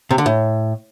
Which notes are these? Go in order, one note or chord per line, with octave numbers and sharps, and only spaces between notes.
C3
D3
A2